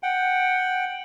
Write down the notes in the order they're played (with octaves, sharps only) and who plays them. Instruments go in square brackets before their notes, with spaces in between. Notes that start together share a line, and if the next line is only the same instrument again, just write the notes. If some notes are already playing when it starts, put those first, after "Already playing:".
[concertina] F#5 G5